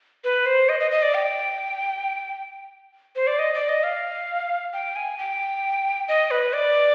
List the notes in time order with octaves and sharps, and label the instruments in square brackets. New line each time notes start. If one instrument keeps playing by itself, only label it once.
[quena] B4
C5
D#5
D#5
D#5
D5
G5
C5
D5
D#5
D5
D#5
F5
G5
G#5
G5
D#5
B4
D5